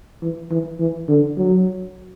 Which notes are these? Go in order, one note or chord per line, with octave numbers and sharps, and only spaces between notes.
E3
E3
E3
D3
F#3